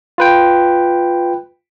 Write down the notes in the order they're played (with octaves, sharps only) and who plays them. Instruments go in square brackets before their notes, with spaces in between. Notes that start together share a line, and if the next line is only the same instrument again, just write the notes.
[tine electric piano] F4 B4 G5